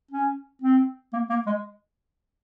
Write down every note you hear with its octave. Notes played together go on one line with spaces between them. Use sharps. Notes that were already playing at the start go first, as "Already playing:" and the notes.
C#4
C4
A#3
A#3
G#3